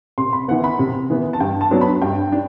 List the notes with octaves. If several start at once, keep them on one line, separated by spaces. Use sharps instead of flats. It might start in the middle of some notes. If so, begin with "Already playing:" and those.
C3 C6
B5
E3 B3 F#5
B5
C3
E3 B3
A5
G2 G5
A5
F#3 B3 D4
B5
G2 G5
D4